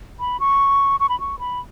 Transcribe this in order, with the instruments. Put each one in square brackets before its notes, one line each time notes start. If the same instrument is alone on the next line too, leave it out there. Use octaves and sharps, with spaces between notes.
[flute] B5
C#6
C#6
B5
C#6
B5